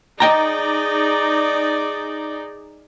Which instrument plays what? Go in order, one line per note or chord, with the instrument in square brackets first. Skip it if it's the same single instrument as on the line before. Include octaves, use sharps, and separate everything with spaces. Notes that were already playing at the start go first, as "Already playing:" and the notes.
[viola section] D#4 G#4 D5 [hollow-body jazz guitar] D#5 G5 A#5